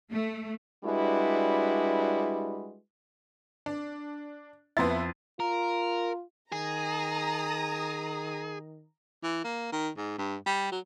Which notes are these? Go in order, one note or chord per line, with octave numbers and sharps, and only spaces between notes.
A3
G3 G#3 D4 E4 F#4 B4
D4
F2 B3 E4 C6 A6
F4 A#4
D#3 G#4 A#5 D#6
E3
A#3
D#3
G#2
G2
G3
F#3